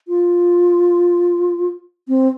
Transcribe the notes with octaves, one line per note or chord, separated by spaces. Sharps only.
F4
C4